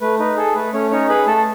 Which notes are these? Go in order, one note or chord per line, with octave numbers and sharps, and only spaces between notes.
A3 B4
D#4 B4
G#4 A4
A3 B4
A3 C#4 C#5
C#4 D#4 C#5
G#4 B4 B5
A3 A4 A5
A5